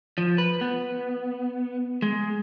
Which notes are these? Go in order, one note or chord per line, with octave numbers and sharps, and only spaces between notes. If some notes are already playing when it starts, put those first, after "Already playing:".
F3
B4
B3
G#3